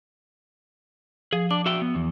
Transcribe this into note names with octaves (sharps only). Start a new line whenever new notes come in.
F3 G#4
D4 D6
F#4 E5 G5
B3
E2